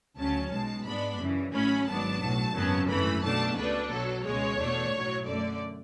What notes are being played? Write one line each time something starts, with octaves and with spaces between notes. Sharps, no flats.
D2 C#3 F#3 C#4 A5
B1 B2 G#3 A5
G#2 G#3 B3 D4 B5
F#2 C#3 E3
A1 A2 F#3 A3 C#4 B5
G#1 G#2 F#3 B3 D4 A5
B1 A2 F#3
G#1 F#2 C#3 F#3 B3
G#1 F#2 E3 A3 B5
B1 B2 A3 D4 A5
C#2 B2 A3 D4 B4
B1 B2 F#3 A4
C#2 B2 G#3 C#5
E2 B2 A3 D4
B1 A2 F#3
F#2 D3 A3 D5